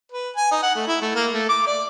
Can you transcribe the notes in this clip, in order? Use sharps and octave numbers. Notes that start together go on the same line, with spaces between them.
B4
G#5
D#4
F#5
A3
E4
A3
A#3
A3
D6
D5